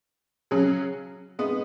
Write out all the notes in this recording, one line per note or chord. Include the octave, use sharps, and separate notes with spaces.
C#3 F#3 C#4 G#4
G#3 B3 D#4